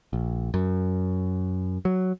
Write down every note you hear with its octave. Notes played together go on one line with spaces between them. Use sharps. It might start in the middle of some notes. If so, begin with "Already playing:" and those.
A#1
F#2
F#3